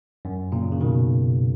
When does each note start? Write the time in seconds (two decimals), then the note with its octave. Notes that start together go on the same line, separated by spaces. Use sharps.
0.25 F#2
0.52 A#2 C#3
0.72 C#3
0.81 B2 D#3